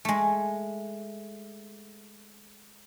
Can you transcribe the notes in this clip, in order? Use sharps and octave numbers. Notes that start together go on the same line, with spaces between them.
G#3 A3